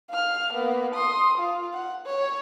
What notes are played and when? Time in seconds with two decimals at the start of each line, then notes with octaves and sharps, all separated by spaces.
0.10 F5 F6
0.53 A#3 B3
0.95 C6 D#6
1.38 F4
1.74 F#5
2.06 C#5